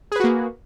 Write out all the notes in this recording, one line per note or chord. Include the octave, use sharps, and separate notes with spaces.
A#3 F#4 G#4 B4